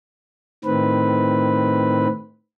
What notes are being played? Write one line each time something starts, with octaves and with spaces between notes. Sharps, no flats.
A2 D#3 C4 B4